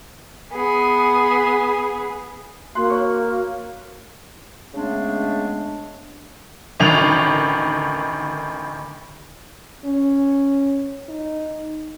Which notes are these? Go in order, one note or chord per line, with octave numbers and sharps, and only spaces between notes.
B3 G#4
A#3 F#4 C6 F#6
C#5 C6 C#6
C#3 G#3 A3 B3 D4
A1 D2 D#3 F7
C#4
D#4